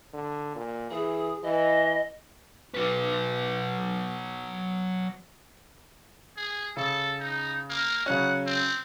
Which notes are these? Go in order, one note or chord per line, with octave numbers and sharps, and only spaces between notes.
D3
A#2
E3 G#4
E3 D#5
F#3 B4
G#4
C#3 A4
D#4
A#3
C#3 F#3 C#4 F#5
C4